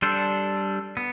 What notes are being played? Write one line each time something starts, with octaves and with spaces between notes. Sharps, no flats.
G3 D4 A4 C5
B3